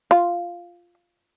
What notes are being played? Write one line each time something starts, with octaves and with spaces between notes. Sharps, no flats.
F4